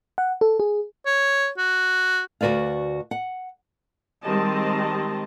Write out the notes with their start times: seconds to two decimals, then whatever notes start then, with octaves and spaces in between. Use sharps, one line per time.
0.18 F#5
0.41 A4
0.60 G#4
1.06 C#5
1.58 F#4
2.41 D2 F#4 B4 D5 F5
3.11 F#5
4.24 D#3 G3 G#3 C4 D#5 A5